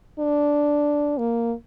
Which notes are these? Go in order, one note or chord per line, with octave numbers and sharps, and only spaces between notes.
D4
A#3